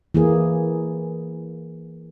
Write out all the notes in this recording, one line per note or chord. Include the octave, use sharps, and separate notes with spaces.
E3 A#3 G#4